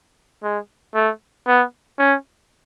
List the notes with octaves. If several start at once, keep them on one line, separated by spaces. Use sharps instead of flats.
G#3
A3
B3
C#4